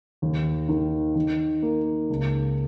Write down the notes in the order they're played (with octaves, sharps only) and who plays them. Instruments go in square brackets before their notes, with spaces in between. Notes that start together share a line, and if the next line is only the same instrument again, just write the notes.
[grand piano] D#2
D#3
D#3
A#3
C#2